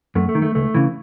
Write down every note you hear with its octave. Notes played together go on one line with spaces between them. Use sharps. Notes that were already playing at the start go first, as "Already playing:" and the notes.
F#2 A3
A3
D#3
A3
C#2 A3
C#3 E3